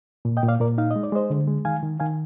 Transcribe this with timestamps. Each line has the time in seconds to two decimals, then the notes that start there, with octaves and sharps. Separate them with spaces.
0.25 A#2
0.37 D#5 G5
0.43 A#2
0.48 D5 F5
0.60 A#2 A#4 D5
0.78 D#4 F5
0.91 D#5
0.96 G#3
1.03 D5
1.13 G#3 C5 D#5
1.30 D3
1.47 G#3
1.65 D#3 F5 G#5
1.82 D#3
2.00 D#3 F5 G#5